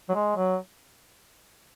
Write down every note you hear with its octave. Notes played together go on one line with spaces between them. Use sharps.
F#3
G#3
F#3